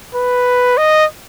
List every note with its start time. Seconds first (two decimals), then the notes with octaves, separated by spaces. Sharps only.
0.14 B4
0.78 D#5